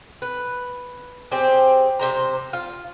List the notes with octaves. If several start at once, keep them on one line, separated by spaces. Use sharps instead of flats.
B4
C4 G4 G#4 C5
C3 C5 A#5
F4